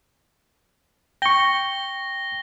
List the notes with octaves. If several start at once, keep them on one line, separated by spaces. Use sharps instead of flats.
G5 C#6 A#6 G7